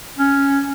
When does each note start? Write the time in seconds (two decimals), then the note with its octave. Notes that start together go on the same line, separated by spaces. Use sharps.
0.19 C#4